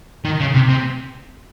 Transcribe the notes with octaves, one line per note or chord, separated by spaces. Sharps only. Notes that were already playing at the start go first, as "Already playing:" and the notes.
D#3
C#3
C3
C3